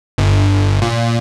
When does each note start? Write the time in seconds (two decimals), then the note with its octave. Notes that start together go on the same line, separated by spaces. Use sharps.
0.18 G1
0.82 A#2